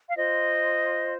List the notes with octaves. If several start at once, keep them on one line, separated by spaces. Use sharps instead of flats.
F5
F4 C5 D#5